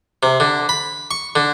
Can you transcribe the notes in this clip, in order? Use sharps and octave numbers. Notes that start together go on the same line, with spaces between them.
C3
D3
B5
C#6
D3